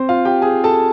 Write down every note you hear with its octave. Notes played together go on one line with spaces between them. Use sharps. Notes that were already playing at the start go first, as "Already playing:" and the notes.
Already playing: C4 C5
F4 F5
G4 G5
G#4 G#5
A4 A5